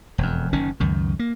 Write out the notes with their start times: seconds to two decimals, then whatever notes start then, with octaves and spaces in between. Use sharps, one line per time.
0.18 E1 F2
0.53 F#1 D#3 C#4
0.80 C#2 F#2 D#3
1.19 A#3